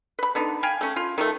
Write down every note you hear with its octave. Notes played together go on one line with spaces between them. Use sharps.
B4 B5
D3 B3 D#4
F5 G5 G#5 B5
A3 C#4
F4
D#3 F3 A3